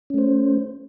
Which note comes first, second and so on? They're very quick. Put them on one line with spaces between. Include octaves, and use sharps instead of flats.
C#4 A3 C5